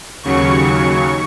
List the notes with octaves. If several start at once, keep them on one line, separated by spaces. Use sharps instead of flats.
D#2 C#3 F#3 C#6
C#6